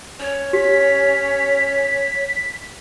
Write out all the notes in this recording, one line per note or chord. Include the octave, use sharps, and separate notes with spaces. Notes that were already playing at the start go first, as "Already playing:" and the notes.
C#4 C#5
G4 B6